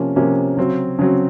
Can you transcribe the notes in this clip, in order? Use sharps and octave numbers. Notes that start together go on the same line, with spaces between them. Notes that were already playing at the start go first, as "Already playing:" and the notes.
Already playing: C3 F3 A#3 C#4
C3 F3 A#3 C#4
C#3 F#3 C4
C#3 F#3 C4